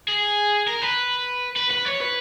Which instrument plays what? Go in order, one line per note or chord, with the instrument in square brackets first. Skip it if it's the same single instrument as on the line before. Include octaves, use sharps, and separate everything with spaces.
[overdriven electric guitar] G#4
A#4
B4
B4
B4
C#5
B4